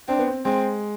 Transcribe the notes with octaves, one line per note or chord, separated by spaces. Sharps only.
C4 D4
B3
C4
G#3 C4